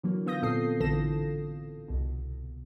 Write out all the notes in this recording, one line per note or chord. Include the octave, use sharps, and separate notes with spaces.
D3 E3 F#3 A#3
D3 B3 F4 D#6 G6 A#6
A#2 C4 A4 D#6 C7
A1 D3 E3 A4 A#6 E7
C2 B2